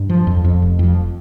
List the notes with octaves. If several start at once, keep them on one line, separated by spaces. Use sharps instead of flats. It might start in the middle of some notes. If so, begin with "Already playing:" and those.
Already playing: G2
F3
F2
F2
F1
F2